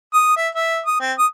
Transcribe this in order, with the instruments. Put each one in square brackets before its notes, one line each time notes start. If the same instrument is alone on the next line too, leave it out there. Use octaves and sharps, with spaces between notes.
[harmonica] D#6
E5
E5
D#6
C4
D#6